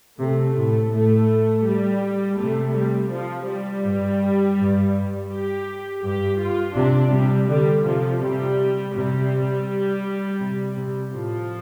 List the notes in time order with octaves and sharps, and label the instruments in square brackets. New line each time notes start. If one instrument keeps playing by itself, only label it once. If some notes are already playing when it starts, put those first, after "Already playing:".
[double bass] C3 [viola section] A3
[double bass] A2
[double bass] A2 [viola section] A3
[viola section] G3
[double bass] C3 [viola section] A3
[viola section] G3
F3
G3
[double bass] G2
G2
[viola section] G4
[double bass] G2 [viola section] G4
[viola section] F4
[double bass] C3 [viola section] D4
[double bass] C3 [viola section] G3
[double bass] D3 [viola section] G3
[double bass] C3 [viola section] F3
[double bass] C3 [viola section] G3
[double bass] C3 [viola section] G3
[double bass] C3
C3
[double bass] A2 [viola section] F3